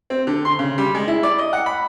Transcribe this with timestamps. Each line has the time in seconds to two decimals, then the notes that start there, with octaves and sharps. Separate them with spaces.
0.10 C4
0.27 D3
0.45 C6
0.59 C#3
0.78 G3
0.95 G#3
1.08 E4
1.23 D5
1.38 D#5
1.53 F#5
1.66 B5